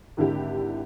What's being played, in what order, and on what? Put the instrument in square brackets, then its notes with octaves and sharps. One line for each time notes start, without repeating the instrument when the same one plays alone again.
[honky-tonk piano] G#1 D3 E4 G4